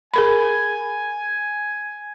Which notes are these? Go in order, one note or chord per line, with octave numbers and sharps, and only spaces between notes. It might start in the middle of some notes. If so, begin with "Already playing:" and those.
G#4 A#4 G#5 B5